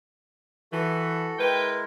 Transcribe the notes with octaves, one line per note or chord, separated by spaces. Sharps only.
E3 F#4 A4
G#3 E4 A#4 B4 G5